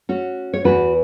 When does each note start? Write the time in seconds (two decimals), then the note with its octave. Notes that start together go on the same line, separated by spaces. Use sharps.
0.09 C#4 F#4
0.54 C#5
0.64 E2 E3 F#4 B4